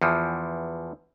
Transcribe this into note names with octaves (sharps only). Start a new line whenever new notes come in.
E2 E3 F3